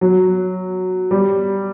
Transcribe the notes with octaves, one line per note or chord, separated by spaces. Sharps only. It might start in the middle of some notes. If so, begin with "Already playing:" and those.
F#3
G3